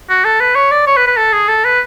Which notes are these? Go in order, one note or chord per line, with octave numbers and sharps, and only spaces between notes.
F#4
A4
B4
C#5
D5
C#5
B4
B4
A4
G#4
A4
B4